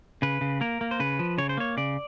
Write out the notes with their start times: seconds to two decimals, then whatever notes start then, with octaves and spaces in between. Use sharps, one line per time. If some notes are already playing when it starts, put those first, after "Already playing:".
0.22 C#3 B4
0.41 C#3
0.61 A#3 A#4
0.81 A#3
0.91 C5
1.00 C#3 B4
1.19 F3
1.38 C#3 C#5
1.49 C5
1.57 A#3 C#5
1.77 C#3 D5